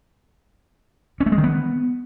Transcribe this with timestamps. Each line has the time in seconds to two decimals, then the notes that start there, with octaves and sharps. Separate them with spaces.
1.20 C#4
1.26 A3
1.32 G#3
1.38 D#3
1.44 B3